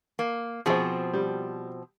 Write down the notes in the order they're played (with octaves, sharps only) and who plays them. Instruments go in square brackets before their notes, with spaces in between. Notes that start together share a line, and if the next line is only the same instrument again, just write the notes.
[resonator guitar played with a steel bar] A#3
[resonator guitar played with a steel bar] B2 F3 C4 [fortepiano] G#4 C5
[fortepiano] G3